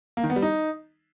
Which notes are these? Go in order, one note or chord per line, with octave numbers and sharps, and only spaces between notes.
A#3
D#3
B3
G3
D#4